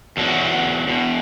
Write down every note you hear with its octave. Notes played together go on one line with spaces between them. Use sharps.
E2 B2 F#3
E2 B2